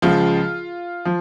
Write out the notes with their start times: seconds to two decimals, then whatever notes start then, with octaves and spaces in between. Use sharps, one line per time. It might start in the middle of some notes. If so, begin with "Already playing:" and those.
0.02 C#2 C#3 F3 F4
1.05 F3